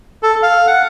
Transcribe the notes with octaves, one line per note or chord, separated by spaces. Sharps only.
A4
F5
F#5